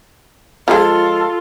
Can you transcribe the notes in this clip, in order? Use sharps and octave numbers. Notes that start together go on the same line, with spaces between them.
F3 G#3 F4 A4